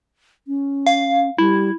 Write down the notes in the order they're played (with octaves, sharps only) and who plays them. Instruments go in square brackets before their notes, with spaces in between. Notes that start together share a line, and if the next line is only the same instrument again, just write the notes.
[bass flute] C#4
[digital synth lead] F5
[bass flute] G3 [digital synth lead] E4